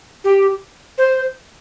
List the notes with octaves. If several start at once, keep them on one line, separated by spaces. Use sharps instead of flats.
G4
C5